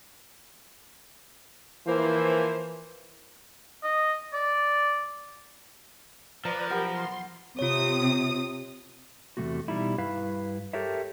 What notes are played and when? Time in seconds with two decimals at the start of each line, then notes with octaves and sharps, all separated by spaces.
1.87 E3 F3 A#3 C5
3.83 D#5
4.33 D5
6.45 F3 B4 D5 A#5
6.70 B1 G4 A#4 F#5 B5
6.95 C6
7.59 C3 F4 C#5 D#6
9.37 E2 C3 D#3 A3 A#3 F#4
9.68 B2 G3 D#4 E4
9.98 G2 E4 B4 F5
10.73 G4 A4 A#4 C#5 E5